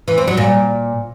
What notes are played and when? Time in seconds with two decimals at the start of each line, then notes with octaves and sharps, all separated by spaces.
0.08 E3
0.18 C4
0.28 F#3
0.37 A#2